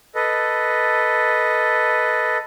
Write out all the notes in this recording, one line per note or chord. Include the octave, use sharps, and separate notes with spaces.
A4 B4 D#5